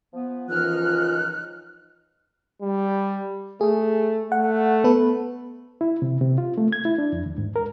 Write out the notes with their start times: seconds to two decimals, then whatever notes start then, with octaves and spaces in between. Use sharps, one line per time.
0.13 F3 B3
0.49 C#2 F#2 E3 F3 D#4 F6 F#6
2.62 G3
3.61 A3 G#4
4.32 A3 F#5
4.84 B3 A4 B4
5.81 E4
6.02 C3
6.21 C3
6.38 F4
6.58 A3
6.72 G#6
6.85 E4
6.98 D4
7.13 F2
7.26 D#2
7.38 G#2
7.56 A#4